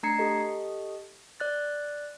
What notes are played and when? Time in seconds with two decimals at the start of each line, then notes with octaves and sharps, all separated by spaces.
0.03 A3 D4 A#5 G#6 C7 C#7
0.19 G4 A4 D#5
1.40 D5 F#6 A6